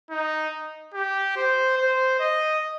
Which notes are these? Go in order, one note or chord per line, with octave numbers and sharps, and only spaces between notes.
D#4
G4
C5
C5
D#5